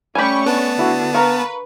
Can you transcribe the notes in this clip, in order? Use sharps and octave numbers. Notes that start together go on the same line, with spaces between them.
G3 A3 C#4 G4 G#5 B5 C#6
B3 D4 A5
D3 E4 F#4
A#4 B4 F5 C#6